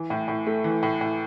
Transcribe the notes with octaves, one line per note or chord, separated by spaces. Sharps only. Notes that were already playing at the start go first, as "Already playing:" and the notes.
Already playing: E3
A2
A2
A3
E3
A2
A2